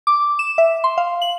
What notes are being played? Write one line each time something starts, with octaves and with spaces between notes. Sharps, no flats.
D6
E7
E5
C6
F5
F#7